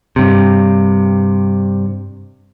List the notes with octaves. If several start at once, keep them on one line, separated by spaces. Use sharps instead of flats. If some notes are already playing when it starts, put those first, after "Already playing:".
G2 C3